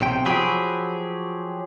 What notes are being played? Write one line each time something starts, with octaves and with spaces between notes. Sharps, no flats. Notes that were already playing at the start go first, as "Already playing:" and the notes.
B1 C3 G5
F3 F#3 G4 G#4 B5